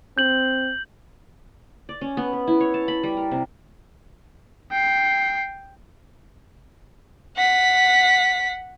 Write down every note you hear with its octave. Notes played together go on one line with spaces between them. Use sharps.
C4 G6 F#7
D5
C#4
B3
B4
E4
C#5
A5
B5
G3
A#4
C3
G5 C7
F#5 B6